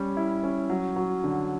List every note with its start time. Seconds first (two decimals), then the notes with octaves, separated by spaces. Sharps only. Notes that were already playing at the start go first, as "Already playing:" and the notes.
Already playing: G3 C#4
0.17 E4
0.43 C#4
0.70 F#3
0.96 F#3
1.24 D3